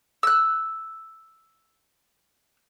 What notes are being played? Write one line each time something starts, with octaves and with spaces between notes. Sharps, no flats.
E6 F#6